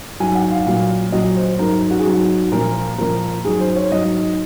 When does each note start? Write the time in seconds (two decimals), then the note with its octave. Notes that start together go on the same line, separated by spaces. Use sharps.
0.20 G#2 F#3 G#5
0.35 F#5
0.51 F5
0.67 A#2 F#3
1.12 A#2 F#3 D#5
1.37 C5
1.59 G#2 F#3 A#4
1.90 F#4
1.99 G#4
2.06 G#2 F#3 F#4
2.52 A#2 F3 A#4
2.98 A#2 F3 A#4
3.45 G#2 F#3 G#4
3.60 C5
3.76 C#5
3.92 G#2 F#3 D#5